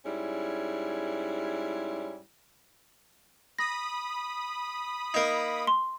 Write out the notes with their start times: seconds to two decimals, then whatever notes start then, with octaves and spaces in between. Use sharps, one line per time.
0.05 G#2 G3 C#4 E4
3.59 B5 D#6 A#6
5.14 A#3 D#4
5.67 C6